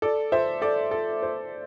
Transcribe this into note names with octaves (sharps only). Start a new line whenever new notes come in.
A4 D5
C5 E5
A4 D5
A4
C5